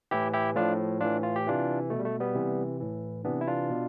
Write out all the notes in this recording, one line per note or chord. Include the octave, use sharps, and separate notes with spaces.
A2 E3 E4 G4
E4 G4
A2 F3 D4 F4
A2 E3 D4 F4
F4
G4
C3 E3 D4 F4
B2 A3
G3
A3
G3 B3
C3 E3
A2 E3
C3 E3 B3 D4
E4
D4 F4
B2